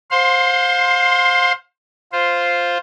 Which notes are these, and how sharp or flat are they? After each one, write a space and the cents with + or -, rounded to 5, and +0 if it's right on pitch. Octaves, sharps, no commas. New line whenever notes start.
C5 +10 F5 +35 C6 +0
F4 +0 C5 +0